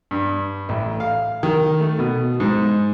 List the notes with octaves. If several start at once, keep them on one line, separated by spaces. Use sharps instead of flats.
G2
A1
F5
D#3
A3
B2
G#2